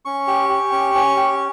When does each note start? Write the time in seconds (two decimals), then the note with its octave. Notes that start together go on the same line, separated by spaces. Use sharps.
0.05 C#4 C#6
0.27 G4
0.49 G4
0.72 C#4
0.95 C#4
1.17 G4